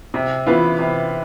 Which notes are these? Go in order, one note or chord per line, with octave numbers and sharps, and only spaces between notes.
C3
E3 B3 F4
C3